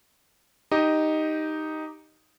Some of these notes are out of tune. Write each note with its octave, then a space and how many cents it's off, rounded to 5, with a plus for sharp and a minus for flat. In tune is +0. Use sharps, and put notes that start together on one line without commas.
D#4 +0 G4 +0 D#5 +0